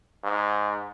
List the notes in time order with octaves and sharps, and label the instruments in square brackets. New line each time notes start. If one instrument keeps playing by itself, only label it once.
[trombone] G#2